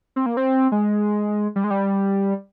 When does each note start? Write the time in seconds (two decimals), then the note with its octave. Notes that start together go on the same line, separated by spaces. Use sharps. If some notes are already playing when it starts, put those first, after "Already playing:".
0.16 C4
0.26 A#3
0.37 C4
0.72 G#3
1.56 G3
1.64 G#3
1.70 G3